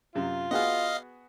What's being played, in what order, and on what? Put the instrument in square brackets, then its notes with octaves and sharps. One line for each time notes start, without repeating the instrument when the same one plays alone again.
[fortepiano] F#2 C3 [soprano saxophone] F4
[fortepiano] B3 F#4 G#4 [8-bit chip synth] D#5 F5